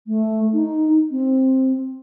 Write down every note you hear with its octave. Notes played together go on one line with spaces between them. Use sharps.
A3
D#4
C4